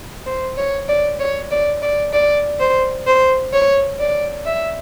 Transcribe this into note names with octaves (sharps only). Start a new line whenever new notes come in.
C5
C#5
D5
C#5
D5
D5
D5
C5
C5
C#5
D5
E5